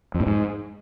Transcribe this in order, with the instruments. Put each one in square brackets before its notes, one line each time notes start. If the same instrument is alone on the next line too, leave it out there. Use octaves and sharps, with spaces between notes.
[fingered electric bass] F2
A2
G#2